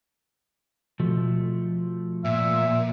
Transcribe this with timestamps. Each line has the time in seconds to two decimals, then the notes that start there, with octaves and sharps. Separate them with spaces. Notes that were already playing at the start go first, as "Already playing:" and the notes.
1.00 B2 F3 A3
2.25 A#2 E5